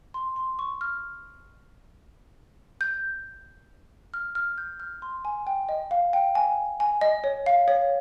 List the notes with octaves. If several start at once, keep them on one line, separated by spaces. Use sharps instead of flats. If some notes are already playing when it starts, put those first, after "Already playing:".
C6
C6
C#6
F6
G6
F6
F6
G6
F6
C6
G#5
G5
D#5
F5
G5
G#5
G#5
D#5
C#5
F5
C#5